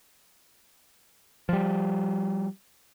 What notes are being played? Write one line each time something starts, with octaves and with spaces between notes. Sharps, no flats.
F3 G3